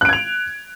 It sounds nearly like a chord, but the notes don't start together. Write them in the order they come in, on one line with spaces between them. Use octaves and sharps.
F#6 D7 G#6 F7